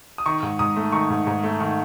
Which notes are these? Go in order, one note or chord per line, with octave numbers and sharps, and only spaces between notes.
D#6
D#3 C#6
G#2
G#2 D#6
A3
D#3 C#6
G#2
G#2
A3
D#3